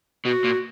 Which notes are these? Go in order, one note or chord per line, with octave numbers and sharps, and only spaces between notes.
B2 F#4
A#2